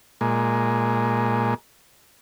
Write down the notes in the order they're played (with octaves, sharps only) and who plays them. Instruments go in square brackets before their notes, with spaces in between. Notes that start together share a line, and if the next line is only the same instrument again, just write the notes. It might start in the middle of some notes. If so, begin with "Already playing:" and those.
[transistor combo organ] A#2 G#3